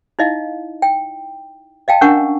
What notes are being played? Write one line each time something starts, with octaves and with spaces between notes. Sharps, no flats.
D#4 E4 D#5 F5
G5
D#5 F5 G5 A5
C#4 D4 A#4 F#5 C#6